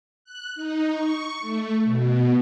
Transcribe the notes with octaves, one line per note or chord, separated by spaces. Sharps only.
F#6
D#4
C#6
A3
B2